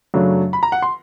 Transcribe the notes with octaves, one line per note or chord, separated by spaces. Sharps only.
F#2 C#3 F#3 A3 D4
B5
A#5
F#5
C6